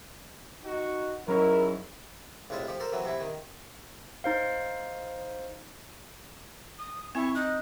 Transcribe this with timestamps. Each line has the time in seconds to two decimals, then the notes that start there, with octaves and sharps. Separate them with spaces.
0.65 D#4 F#4
1.28 G#2 F#3 C#4 E4 A#4 C#5
2.50 C2 A2 G#3 F4 E5
2.68 F3 G4
2.80 A4 A#4 C5
2.93 E3 F#3 C4
3.05 C3 E4
3.21 D#3
4.24 D#4 C5 F5
6.79 D#6
7.15 C4 E4 G#5 C#6
7.35 D#4 F#6